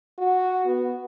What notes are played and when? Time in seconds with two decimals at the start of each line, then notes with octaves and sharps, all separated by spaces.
0.18 F#4
0.66 B3